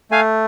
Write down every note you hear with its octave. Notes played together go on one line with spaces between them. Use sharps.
A3 F5 G#5